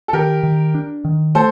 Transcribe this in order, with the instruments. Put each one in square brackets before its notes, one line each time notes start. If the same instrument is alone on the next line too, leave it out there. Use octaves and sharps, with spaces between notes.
[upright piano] A4
[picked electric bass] D#3 [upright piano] G4 A#4
[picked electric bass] D#3
D4
D#3
[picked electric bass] A3 [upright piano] A4 C5